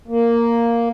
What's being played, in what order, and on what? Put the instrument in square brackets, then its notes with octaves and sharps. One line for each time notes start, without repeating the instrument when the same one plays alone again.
[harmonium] A#3